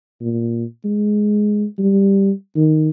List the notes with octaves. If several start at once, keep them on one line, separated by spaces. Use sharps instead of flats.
A#2
G#3
G3
D#3